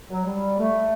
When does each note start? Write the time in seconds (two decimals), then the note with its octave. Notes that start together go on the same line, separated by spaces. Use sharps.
0.08 F#3
0.25 G3
0.58 A3